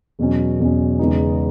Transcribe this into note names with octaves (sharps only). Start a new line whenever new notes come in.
E2 B2 F#3 C#4
E2 B2 F#3 C#4
E2 C#3 G#3 B3 D#4